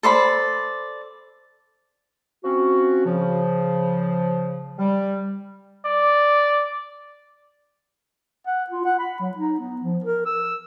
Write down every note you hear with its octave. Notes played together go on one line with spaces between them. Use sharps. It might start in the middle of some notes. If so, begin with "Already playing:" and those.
A4 C5 D5 B5
F3 C4 C#4 F#4
C#3 F3
G3
D5
F#5
F4
F#5
B5
F#3
D#4
B3
F3
A#4
E6